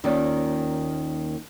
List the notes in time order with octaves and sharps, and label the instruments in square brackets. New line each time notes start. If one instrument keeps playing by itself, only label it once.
[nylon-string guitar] D#2 D#3 A#3 C#4 F4 D5